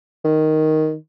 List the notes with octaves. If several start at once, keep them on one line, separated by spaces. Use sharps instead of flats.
D#3